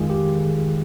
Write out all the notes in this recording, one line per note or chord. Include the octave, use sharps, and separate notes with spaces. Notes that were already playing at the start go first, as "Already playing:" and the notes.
Already playing: F2 D#3 G#3 F4 G#4
G4